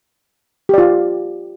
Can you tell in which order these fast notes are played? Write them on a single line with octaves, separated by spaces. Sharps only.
G4 D5 F4